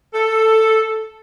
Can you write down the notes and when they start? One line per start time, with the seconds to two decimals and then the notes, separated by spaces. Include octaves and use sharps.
0.14 A4